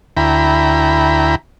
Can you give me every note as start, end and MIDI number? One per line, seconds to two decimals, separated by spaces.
0.17 1.35 38
0.17 1.35 64
0.17 1.35 79
0.17 1.35 82
0.17 1.35 83